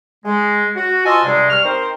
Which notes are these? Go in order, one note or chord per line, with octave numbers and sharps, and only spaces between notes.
G#3
F#4
F4 C5 D#5 G#5 A5 E6
G2 C3 G#3
G2 G3 C#6 F6
C4 D#4 A#4 C5